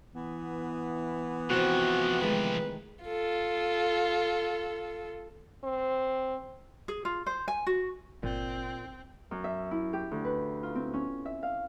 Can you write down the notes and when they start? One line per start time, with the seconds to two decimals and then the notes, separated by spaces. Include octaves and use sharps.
0.15 E3 B3
1.51 C3 F3 C4 F#4 C5
2.21 D#3 G#3 A3 B4
3.05 F4 A4
5.64 C4
6.88 G#4
7.05 F4
7.26 C5
7.48 G#5
7.67 F#4
8.23 G1 A#2 C4
9.31 F#2
9.44 E5
9.71 E4
9.93 G4
10.11 D2
10.25 B4
10.63 F4
10.75 C4
10.94 C#4
11.25 E5
11.43 F5